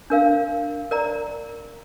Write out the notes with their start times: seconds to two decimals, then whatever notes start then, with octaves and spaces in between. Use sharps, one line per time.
0.10 D4 A#4 F5
0.91 A#4 D5 A#5